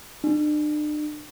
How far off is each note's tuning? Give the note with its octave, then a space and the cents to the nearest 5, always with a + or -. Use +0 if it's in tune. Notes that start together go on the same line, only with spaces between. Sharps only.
D4 +40